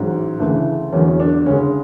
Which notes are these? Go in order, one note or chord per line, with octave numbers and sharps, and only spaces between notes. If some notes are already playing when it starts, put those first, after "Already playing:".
Already playing: A1 G#2 F#3
D2 C#3 E3 A3
E2 D3 F#3 C#4
C#4
D4
D2 C#3 G#3 C#4